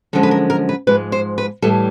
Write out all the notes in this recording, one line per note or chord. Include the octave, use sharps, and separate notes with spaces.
F#2 D3 F3 G#3 A4
B4
A#4
A#4
B4
G#2 F3 G#3 B4
C5
B4
A2 E3 G3 A4